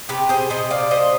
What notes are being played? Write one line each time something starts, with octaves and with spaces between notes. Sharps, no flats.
C3 G4 B4
G#4 C5
C3 C5 D#5
D5 F5
C3 C5 D#5